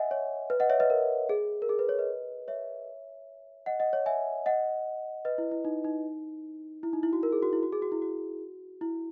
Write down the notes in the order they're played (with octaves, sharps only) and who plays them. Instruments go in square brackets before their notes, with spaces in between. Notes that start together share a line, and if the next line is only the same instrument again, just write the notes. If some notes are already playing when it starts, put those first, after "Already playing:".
Already playing: [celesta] D#5 E5 F#5 G#5
C#5
B4
D#5 F#5
C#5 E5
B4 D#5
A#4
G#4
A#4
G#4
B4
C#5
B4 D#5
C#5 E5
D#5 F#5
D#5 F#5
C#5
E5 G#5
D#5 F#5
B4 D#5
E4
E4
D#4
D#4
E4
D#4
E4
F#4
A#4
G#4
F#4
E4
F#4
G#4
F#4
E4
F#4
E4